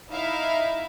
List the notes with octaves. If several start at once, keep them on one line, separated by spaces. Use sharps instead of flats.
D#4 E4 E5 F5